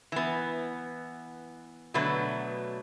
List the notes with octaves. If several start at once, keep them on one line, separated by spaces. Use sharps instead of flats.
E3 B3
B2 D3 F#3 A3 B4